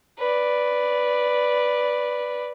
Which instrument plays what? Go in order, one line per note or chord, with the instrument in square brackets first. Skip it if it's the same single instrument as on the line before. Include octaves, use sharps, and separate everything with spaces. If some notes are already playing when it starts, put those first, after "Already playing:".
[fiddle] B4 D5